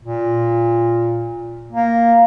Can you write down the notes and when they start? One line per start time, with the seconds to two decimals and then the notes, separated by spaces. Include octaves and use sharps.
0.04 A#2
1.72 A#3